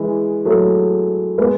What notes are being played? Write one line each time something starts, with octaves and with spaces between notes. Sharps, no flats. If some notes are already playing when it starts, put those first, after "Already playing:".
Already playing: E3 G#3
F#3 A3
G#3 B3